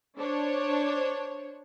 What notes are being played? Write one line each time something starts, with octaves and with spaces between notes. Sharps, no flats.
D4 C5 C#5